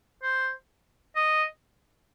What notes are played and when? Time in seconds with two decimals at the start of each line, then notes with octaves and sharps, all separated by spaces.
0.22 C5
1.16 D#5